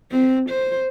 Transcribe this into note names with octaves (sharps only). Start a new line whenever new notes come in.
C4
C5